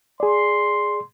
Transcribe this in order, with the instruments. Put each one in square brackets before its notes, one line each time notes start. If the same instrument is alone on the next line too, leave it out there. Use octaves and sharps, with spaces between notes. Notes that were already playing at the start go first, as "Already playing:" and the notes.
[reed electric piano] G#4 D5 [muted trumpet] C6